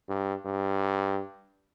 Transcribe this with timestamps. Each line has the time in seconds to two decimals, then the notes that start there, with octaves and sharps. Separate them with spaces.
0.09 G2
0.45 G2